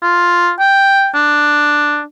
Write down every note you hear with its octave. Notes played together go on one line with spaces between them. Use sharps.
F4
G5
D4